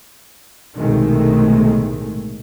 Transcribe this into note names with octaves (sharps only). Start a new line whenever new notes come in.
B1 A2 C3 D#3 G#3 A3